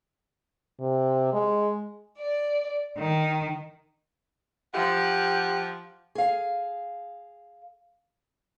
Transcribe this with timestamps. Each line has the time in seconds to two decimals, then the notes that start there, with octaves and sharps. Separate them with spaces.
0.80 C3
1.33 G#3
2.18 D5
2.98 D#3
4.74 F3 G4 F#5
6.15 G#4 F5